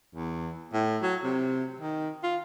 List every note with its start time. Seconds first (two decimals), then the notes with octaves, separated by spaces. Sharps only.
0.15 E2
0.73 A2
1.02 F#3
1.24 C3
1.81 D#3
2.24 F4